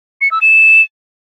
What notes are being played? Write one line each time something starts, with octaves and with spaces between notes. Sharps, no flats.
C#7
E6
E7